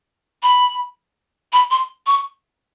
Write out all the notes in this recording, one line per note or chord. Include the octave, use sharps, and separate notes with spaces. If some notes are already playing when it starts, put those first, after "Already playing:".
B5
B5
C6
C#6